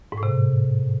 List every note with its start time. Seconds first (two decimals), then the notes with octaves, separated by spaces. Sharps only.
0.12 G#2
0.18 A2
0.23 C3